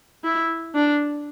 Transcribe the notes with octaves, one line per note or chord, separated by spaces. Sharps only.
E4
D4